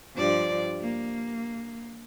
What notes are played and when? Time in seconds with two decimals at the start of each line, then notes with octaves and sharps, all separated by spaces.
0.16 G2 F3 D5
0.82 A#3